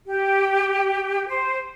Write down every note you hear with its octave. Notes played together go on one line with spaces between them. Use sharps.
G4
C5